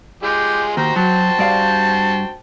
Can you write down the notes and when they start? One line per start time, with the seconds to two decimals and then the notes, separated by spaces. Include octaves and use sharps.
0.23 G#3 F4 G4 G#4
0.77 D#2 F#4 C5 G5 A#5
0.96 F#3 A5
1.39 G2 D5 F5